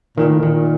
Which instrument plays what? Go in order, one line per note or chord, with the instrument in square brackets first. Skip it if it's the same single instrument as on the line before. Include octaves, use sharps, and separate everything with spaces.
[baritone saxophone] A#2 [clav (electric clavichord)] D#3
[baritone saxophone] A2
[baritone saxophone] A#2 [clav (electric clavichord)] D#3